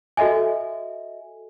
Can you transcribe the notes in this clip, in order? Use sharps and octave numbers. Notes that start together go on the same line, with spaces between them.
F#4 A4 D#5 E5 G#5